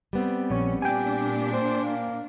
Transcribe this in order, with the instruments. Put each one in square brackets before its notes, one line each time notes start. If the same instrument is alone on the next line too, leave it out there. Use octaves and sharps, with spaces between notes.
[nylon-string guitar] G3 B3 C4
[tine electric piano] A#1 C#5 [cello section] C#4
[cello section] A#2 D4 [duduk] G4 [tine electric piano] G5 G#5
[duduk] C5
A#3